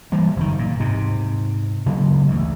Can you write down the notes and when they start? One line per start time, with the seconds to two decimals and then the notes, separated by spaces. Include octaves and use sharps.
0.12 E3 G3 A#3
0.36 F#1 D#3
0.59 A#2
0.80 G#2 C3
1.86 C#3 F#3 G#3 A#3
2.28 A1 D2